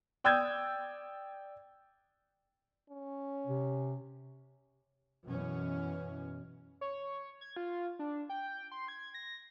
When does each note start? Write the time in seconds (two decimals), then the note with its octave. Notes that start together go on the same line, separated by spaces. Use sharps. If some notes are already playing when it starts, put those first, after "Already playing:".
0.24 D5 G5 D#6 E6 G6 G#6
2.90 C#4
3.47 C3
5.26 F#2 B2 E3 C#4
6.81 C#5
7.41 G#6
7.57 F4
7.99 D4
8.29 G5
8.72 C6
8.88 G#6
9.14 A#6